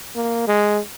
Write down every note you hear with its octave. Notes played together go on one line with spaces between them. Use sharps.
A#3
G#3